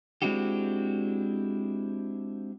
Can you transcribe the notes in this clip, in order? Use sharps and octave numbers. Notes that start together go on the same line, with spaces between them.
G#3 C4 D4 E4 F#4 G4